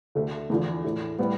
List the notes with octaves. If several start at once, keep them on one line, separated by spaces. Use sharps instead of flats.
D2 D3 A3
E2 D3 F3
A2 E3 A3
A2 G3 B3